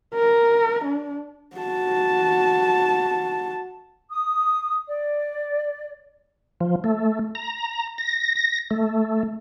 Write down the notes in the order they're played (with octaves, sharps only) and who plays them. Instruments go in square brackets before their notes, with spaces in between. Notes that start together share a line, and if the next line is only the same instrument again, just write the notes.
[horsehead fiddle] A#4
D4
F#4 A5
[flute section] D#6
D5
[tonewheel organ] F3
A3
A#5
A#6
A#6
A3